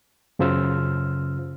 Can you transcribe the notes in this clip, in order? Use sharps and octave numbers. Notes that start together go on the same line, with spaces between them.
F#2 C#3 F4 C5 E6 F6